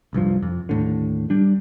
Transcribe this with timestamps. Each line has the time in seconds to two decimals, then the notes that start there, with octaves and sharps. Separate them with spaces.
0.13 F1 C2 G2 F3
0.43 F2
0.69 D#2 A2 D3
1.30 G3 D4